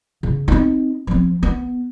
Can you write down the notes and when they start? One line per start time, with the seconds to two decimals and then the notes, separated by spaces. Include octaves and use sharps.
0.23 C#3
0.48 C4 D#4
1.07 F3 C4
1.43 B3